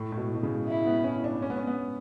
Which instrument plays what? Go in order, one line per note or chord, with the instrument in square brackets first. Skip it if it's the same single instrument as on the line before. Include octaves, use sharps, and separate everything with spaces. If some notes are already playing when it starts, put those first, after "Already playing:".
Already playing: [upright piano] A2
A2
B2
B2
C#3
[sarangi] E4
[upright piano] B3
C#4
D4
C#4
B3
C#4
B3